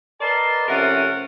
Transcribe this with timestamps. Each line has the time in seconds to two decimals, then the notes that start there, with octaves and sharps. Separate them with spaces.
0.21 A#4 B4 D5 D#5 A5 C6
0.68 C3 F3 A3 C#4 A#4 F#5